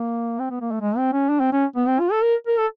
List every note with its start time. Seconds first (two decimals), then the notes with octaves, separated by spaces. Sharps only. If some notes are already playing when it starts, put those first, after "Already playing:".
Already playing: A#3
0.39 C4
0.50 B3
0.61 A#3
0.71 A3
0.81 G#3
0.98 C4
1.13 C#4
1.29 D4
1.40 C4
1.53 C#4
1.76 B3
1.87 C4
2.00 F4
2.12 A4
2.23 A#4
2.47 A#4
2.59 A4